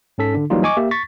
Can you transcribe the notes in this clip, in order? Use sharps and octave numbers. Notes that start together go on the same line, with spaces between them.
G#2 C#4 A4 B6
D3 D4
E3 F#3 G3 A#3 D#4 F4
D#5 G#5 C#6 D6
A#3 G4 E5
C#6 A6 B6